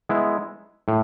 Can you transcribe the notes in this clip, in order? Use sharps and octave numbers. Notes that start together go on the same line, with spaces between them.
G#3 B3 E4
A2